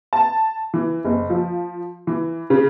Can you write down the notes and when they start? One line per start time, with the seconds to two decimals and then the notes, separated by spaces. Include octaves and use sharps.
0.13 A5
0.74 E3
1.05 F#1
1.30 F3
2.07 E3
2.50 C#3